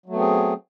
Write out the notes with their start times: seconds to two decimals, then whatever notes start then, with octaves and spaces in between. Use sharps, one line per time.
0.06 F#3
0.09 A3
0.13 B3
0.16 C4
0.20 G#4